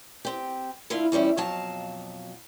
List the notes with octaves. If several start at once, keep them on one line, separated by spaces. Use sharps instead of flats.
C4 G4
D3 A3 E4 F4 F5
E2 F3 G3 C#4 E4
F2 B2 F#3 F5 A5